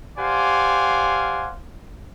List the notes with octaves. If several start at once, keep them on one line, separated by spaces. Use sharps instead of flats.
G4 C5 D5 F5 F#5 G#5